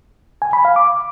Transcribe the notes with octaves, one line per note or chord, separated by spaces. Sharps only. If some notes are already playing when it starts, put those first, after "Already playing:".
G#5
B5
F5
D6